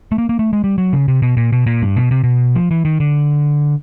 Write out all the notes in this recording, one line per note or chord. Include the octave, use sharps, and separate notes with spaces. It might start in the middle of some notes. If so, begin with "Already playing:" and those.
A3
A#3
A#3
A3
G#3
G3
F#3
C#3
C3
B2
A#2
B2
A#2
G2
B2
C3
B2
F3
E3
D#3
D3